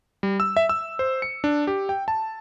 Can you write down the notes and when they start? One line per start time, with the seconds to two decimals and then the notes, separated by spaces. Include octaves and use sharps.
0.23 G3
0.40 E6
0.57 E5
0.69 E6
0.99 C5
1.22 C#7
1.44 D4
1.67 G4
1.89 G5
2.08 A5